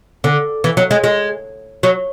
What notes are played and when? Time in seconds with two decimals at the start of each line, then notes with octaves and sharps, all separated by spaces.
0.24 D3
0.64 E3
0.77 F#3
0.91 G#3
1.04 G#3
1.83 F#3